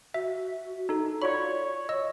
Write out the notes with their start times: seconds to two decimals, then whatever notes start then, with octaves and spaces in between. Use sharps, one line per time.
0.14 F#4 E5
0.89 D#4 A4
1.22 F4 F#4 C#5 D5 B5
1.89 D#5 E6